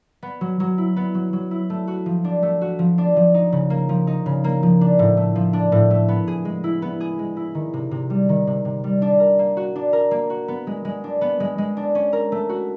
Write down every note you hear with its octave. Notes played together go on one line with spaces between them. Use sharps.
B3
F#3
F#3
E4
B3
F#3
F#3
E4
A3
F#4
F3
D4
A3
F#4
F3
D4
F3
D#4
C#3
A#3
F3
D#4
C#3
A#3
F3
D4
A2
A3
F3
D4
A2
A3
B3
G#4
G#3
E4
B3
G#4
G#3
E4
D#3
C3
C3
G3
D#3
C3
C3
G3
D4
A#4
A#3
F#4
D4
A#4
A#3
F#4
B3
G#3
G#3
D4
B3
G#3
G#3
D4
C#4
A#4
A3
F#4